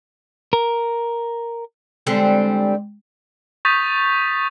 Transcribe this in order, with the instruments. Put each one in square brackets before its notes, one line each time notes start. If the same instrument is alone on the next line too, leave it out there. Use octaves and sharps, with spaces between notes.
[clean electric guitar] A#4
[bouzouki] D3 G3 C4 [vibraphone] G#3 G5
[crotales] C#6 D#6 G6 A6 B6 F7